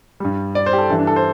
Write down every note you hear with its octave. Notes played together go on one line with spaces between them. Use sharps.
G2 G3
D5
C5
G4
A4
G2 E3 G3 A4
D4
A4
C5